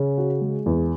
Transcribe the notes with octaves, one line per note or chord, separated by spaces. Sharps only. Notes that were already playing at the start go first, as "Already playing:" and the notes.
Already playing: C#3 C#4
F#4
G#3
E2